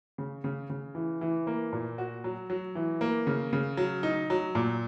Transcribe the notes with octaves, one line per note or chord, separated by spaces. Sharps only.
C#3
C#3
C#3
E3
E3
A#3
A#2
F#4
F#3
F#3
E3
A#3
C#3
C#3
F#3
D#4
F#3
A#2